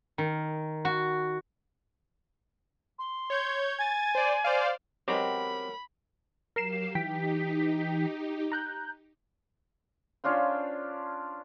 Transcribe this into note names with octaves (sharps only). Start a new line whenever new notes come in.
D#3
F#4
C6
C#5 G6 G#6
G#5 G#6 A6
C5 D5
C5 D5 F5
F#3 G#3 B3 C4 G4 A#4 C#5 B5
F#3 G4 A#4 F5 C7 E7
E3 D#4 G4 G5 B6
A#5 F#6 G6
C#4 D4 F4 C5